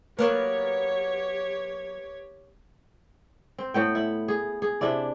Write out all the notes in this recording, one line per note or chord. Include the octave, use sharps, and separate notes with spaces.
F#3 A#3 B3 G4 A#4 B4 C#5
C4
A2 B3 G5
E4
G#4
G#4
C3 D4 E4 D5